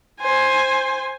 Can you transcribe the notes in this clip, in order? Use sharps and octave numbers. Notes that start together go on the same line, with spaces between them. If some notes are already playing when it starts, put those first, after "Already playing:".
C5 G#5